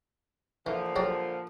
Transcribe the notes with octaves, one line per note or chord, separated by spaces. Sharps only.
A#2 D3 E3 F3
F#3 G3 D5